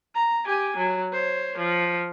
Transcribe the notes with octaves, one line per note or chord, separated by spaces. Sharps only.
A#5
G4 G#5
F#3
C5 C#5
F3